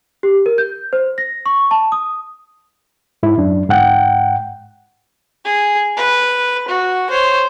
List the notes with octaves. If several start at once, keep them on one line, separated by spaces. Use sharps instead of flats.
G4
A#4
G6
C5
A#6
C#6
A5
D#6
G#2 E4
F#2 D4
G#2 F#5 G5
G#4
B4
F#4
C5 C#5